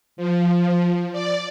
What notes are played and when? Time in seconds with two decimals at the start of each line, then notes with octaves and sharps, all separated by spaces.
0.17 F3
1.12 D5